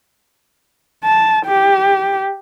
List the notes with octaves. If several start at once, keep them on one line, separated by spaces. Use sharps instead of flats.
A5
G4